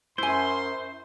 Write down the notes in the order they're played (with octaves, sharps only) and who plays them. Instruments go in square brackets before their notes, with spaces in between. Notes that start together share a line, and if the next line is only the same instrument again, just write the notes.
[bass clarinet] F#2 [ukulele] E4 G#5 [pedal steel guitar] C5 [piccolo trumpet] C6